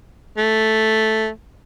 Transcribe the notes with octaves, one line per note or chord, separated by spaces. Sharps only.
A3